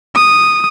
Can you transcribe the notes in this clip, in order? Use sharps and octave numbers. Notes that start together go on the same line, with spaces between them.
D#6